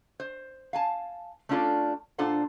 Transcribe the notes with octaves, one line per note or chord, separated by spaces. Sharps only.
C5
F5 G#5 A5
A3 C#4 D4 F4 A4 D5
A#2 D4 F4 A4 C5 F#5